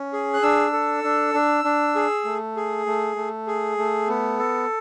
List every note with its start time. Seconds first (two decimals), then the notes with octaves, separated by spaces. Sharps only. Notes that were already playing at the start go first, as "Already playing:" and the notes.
Already playing: C#4
0.13 G#4
0.34 F#6
0.42 D4 E6
0.73 A4
1.04 D4
1.34 D4
1.64 D4
1.96 G#4
2.25 A3
2.56 G#4
2.86 A3
3.16 A3
3.47 G#4
3.78 A3
4.08 B3
4.39 A4